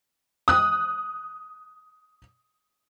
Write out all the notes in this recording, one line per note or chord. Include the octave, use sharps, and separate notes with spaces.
D#6 F#6